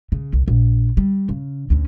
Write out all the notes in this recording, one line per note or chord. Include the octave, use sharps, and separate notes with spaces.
C#3
C2
A#1
G3
C#3
D2 C#4